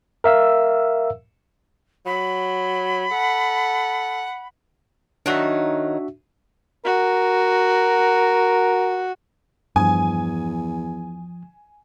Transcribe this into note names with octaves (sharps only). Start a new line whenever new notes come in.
A#4 E5 F5 E6
F#3 B5
A4 F#5
D#3 F#3 D4 D#4 F#4 E5
F#4 A#4
E2 G2 F3 G#5 D#6